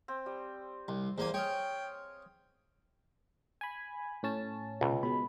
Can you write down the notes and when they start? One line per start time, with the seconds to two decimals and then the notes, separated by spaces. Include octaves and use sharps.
0.08 C4
0.26 G3
0.88 C2 C6
1.18 E2 A#3 C5 G#5
1.34 G#4 C#5 D#5 F5 G5
3.61 G#5 B5
4.23 A2 C#4 A5
4.81 C#2 B2
5.03 B2 G#3 B5